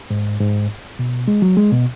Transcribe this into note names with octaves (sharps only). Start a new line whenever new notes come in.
G#2
G#2
B2
G#3
F#3
G#3
B2